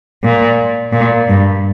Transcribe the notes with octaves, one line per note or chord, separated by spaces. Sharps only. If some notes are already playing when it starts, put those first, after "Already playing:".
A#2
A#2
G2